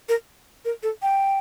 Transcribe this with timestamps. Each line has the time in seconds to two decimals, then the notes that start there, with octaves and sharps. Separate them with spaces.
0.09 A#4
0.65 A#4
0.83 A4
1.02 G5